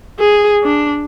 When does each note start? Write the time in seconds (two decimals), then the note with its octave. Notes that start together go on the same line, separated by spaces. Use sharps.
0.19 G#4
0.64 D4